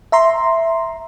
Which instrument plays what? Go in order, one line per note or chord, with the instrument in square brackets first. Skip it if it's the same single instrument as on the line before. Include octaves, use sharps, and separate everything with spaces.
[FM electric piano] E5 A#5 C6